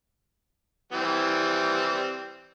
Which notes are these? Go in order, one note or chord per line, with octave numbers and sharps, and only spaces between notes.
E3 G3 C4